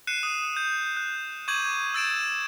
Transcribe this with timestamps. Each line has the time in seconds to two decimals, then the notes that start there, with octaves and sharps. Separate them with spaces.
0.07 F#6 C7 C#7 D#7 E7
0.23 D#6
0.57 G6
0.97 F#6
1.48 C#6 D6 G6 G#6 D#7 F#7
1.94 E6 A6 D7 E7